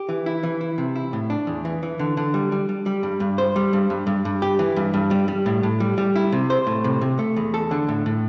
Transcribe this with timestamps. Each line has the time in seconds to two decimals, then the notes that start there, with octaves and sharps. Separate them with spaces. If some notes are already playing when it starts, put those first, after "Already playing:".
Already playing: G4
0.09 E3
0.26 E4
0.43 E3
0.61 E4
0.78 C3
0.96 E4
1.13 A2
1.30 D4
1.47 E2
1.65 E3
1.83 E3
1.99 D3
2.17 D3
2.34 G3
2.52 G3
2.69 G3
2.86 G3
3.03 G2
3.20 G2
3.38 C5
3.56 G3
3.73 G2
3.90 G2
4.07 G2
4.25 G2
4.42 G4
4.59 E3
4.76 G2
4.94 G2
5.11 G3
5.28 G3
5.46 A2
5.63 A2
5.80 G3
5.98 G3
6.16 E4
6.32 C3
6.50 C5
6.67 A2
6.84 C3
7.01 C3
7.19 A3
7.36 E2
7.54 A4
7.71 D3
7.89 A2
8.06 A2